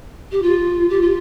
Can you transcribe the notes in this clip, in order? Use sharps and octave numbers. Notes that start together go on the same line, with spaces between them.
G4
F4
G4
F4